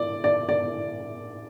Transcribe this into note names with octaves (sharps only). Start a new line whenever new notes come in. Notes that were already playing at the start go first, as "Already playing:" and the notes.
Already playing: D5
D5
D5